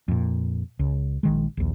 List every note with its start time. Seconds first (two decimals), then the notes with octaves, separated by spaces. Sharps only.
0.08 F2 A#2
0.79 C#2
1.23 A#1 D#3 G#3
1.57 A#1 D#2